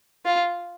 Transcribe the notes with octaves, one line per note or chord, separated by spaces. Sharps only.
F4